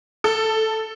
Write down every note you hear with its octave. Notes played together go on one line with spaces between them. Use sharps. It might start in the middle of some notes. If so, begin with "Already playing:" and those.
A4